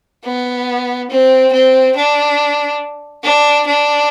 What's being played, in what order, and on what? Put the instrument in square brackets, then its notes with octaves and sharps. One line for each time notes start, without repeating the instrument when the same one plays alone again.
[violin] B3
C4
C4
D4
D4
D4